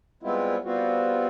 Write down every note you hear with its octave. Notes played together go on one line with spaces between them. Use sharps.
G3 G#3 B3 C4 E4 F4
G3 B3 C4 F4 F#4